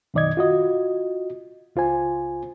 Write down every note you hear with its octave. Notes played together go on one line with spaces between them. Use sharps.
F#2 B2 D#3 D5 D#5 G#6
F4 F#4 D#5
C#2 F4 C5 G#5